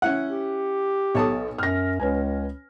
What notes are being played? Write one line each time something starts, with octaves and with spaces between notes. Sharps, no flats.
C#4 E4 F#5
G4
B1 A4 C#5 A5 D#6
F#2 F6 A#6
C#2 C#4 B4 G#5